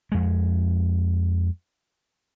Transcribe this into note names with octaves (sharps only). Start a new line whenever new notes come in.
F2 G#3